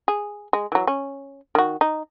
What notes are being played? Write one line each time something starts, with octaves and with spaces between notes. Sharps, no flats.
G#4
G#3
E3 F#3
C#4
D#3 F#4
D#4